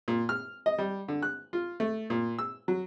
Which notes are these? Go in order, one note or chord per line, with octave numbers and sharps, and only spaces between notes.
A#2
F6
D#5
G3
D3
F#6
F4
A3
A#2
E6
F#3